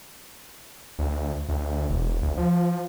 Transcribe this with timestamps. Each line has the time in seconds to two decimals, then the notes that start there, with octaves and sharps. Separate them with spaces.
0.99 D2
1.49 D2
1.90 E1
2.22 D2
2.37 F3